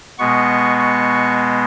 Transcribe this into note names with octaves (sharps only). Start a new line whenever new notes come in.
B2 G#3 B3 C#6
C#6